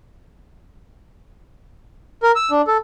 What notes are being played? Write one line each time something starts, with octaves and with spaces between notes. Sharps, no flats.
A#4
E6
D4
A4